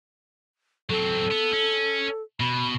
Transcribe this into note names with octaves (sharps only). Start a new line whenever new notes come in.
F#3 C4 A4
B3
C#4
B2 B5